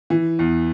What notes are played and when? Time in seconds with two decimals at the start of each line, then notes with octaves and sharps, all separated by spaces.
0.10 E3
0.39 E2